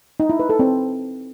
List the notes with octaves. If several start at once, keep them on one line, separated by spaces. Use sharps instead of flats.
D#4
E4
B4
A4
C4